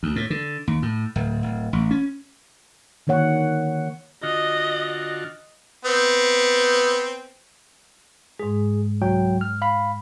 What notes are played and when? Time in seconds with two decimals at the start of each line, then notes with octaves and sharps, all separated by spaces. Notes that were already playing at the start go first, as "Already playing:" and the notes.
0.03 D2
0.16 A2
0.30 D3
0.67 D#2
0.82 A2
1.16 D1
1.43 D1
1.73 A1
1.91 C#4
3.07 D3 D#3 A#3 C#5 F#5
4.23 D3 F4 F#4 D#5
5.85 B3 C4
8.39 G#2 G#3 G#4
9.01 C2 F#3 G5
9.41 F6
9.62 F5 B5